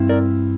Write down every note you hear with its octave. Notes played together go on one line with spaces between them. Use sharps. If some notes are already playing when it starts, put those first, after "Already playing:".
Already playing: G2 C4 E4
A#4 D5